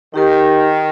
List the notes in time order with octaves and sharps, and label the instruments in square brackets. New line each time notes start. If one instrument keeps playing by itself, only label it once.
[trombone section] D#3 [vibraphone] D#4 G4 A#4